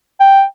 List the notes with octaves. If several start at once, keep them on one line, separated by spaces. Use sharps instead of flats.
G5